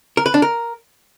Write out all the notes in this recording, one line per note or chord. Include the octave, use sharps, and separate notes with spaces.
A#4
B4
D4
A#4